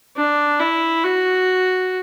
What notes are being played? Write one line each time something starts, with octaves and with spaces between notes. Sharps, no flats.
D4
E4
F#4